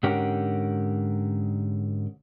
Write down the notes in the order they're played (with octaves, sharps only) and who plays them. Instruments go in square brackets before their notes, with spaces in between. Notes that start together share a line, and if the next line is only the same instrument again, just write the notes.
[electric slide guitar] G#2 D3 C#4 G4 A#4 F#5